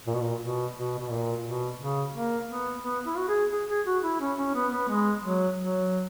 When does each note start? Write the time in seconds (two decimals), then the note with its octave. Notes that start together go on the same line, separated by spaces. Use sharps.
0.07 A#2
0.15 B2
0.22 A#2
0.42 B2
0.76 B2
0.99 B2
1.10 A#2
1.45 B2
1.80 C#3
2.14 A#3
2.48 B3
2.83 B3
3.06 E4
3.17 F#4
3.29 G#4
3.52 G#4
3.69 G#4
3.86 F#4
4.04 E4
4.21 C#4
4.38 C#4
4.55 B3
4.72 B3
4.89 G#3
5.24 F#3
5.58 F#3